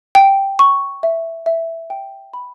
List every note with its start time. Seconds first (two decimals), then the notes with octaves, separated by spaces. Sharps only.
0.15 G5
0.59 C#6
1.03 E5
1.46 E5
1.90 G5
2.33 B5